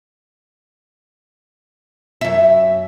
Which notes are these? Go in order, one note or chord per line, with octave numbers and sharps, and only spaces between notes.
F#2 E5